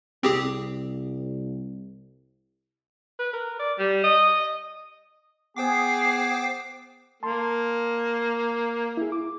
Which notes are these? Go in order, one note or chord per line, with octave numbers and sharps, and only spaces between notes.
C2 C4 G4 G#4
B4
A#4
D5
G3
D#5
D#5
B3 G#4 C5 G5 D6 C7
A#3 A5 C6
E4 G#4
D6